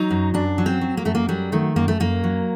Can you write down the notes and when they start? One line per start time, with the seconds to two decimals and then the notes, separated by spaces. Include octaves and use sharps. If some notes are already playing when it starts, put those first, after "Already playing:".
Already playing: F#3 D#4
0.10 F#2
0.34 F#2 D4
0.58 F#3
0.66 C4
0.81 F#3
0.97 A#3
1.05 F#2 A3
1.15 A#3
1.29 F#3 G3
1.52 D#3 A3
1.76 F#2 A#3
1.88 A3
2.00 F#2 A#3
2.24 F#3